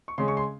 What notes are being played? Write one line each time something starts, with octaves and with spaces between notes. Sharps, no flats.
C#6
C#3 G#3 C#4 C6
C#6
C6